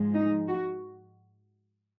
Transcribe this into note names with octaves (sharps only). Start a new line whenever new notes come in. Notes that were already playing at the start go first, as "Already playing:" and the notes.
Already playing: G#2 F3 G#3
D#4
F#4